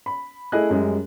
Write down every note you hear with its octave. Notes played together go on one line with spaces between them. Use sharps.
B5
A3 E4 G#4 D#5 F#6
F#2 G3 G#3